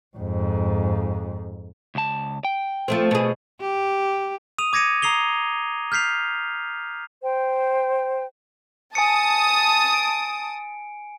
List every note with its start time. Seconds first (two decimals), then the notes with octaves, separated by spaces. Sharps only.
0.17 F2 G#2
1.95 C#2 A5
2.45 G5
2.88 F3 A3 C4
3.11 B2 A3 G#4
3.61 G4
4.58 D#6 D#7 F7
4.73 D6 G#6 A#6 C#7 D#7
5.02 A#5 D#6 C7 F7 G7
5.92 F6 G6 B6 C7 F7
7.23 C5 G5
8.95 G#5 A5 D#6 C#7
9.94 D7